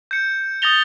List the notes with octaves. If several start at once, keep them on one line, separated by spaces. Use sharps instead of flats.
G6 C#7
D#6 G6 A6 A#6 F7 G7